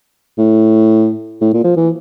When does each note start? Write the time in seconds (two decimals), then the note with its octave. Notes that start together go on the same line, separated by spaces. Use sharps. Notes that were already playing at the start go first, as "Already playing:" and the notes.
0.38 A2
1.41 A2
1.54 A#2
1.64 F3
1.77 E3